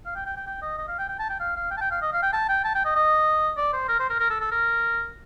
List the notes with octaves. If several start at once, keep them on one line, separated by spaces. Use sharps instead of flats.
F5
G5
G5
G5
G5
D#5
D#5
F5
G5
G5
A5
G5
F5
F5
G5
A5
G5
F5
D#5
F5
G5
A5
G5
A5
G5
D#5
D#5
D5
C5
A#4
C5
A#4
A#4
A4
A4
A#4